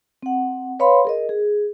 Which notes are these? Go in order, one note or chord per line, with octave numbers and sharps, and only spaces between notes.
C4 F#5
B4 C#5 F5 B5 C6
G#4 A#4 D#5
G#4